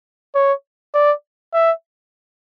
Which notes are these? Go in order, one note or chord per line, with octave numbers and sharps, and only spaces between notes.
C#5
D5
E5